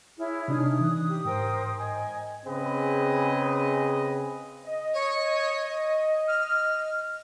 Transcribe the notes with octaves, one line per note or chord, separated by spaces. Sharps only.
E4 G#4 C#5 F6
C3 D4 D#4 D#6
E3 F#6
G4
G#2 A#4 C5 G5
D#5 G#5
C#3 C4 G#4 B4 D#5
D#5
C#5
F6